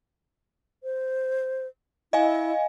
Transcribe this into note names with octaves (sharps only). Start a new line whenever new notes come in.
C5
E4 D#5 F5 G#5